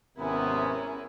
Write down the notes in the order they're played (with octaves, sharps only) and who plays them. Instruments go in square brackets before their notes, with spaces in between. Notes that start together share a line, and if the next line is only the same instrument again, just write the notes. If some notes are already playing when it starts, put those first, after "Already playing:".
[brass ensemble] G#1 C3 B3 [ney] C#4 [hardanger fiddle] E4 G#4 [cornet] A#4